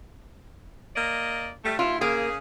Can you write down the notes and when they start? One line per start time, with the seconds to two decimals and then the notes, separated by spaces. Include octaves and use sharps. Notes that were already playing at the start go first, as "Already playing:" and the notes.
0.95 A#3 D5 D#5
1.63 G3 A3
1.79 D#2 E4 F4
2.01 C#3 A#3 G#4